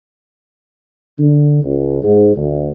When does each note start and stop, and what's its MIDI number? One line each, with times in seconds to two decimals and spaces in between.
1.20 1.60 50
1.64 2.00 37
2.03 2.33 44
2.36 2.72 38